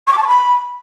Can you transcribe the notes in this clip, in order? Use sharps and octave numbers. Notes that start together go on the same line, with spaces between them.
C#6
D6
A5
C#6
B5